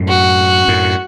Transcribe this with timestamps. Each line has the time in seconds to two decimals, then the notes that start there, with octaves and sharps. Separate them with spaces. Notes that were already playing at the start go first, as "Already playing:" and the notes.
Already playing: F#2 A2
0.09 F#4
0.68 F#2 A2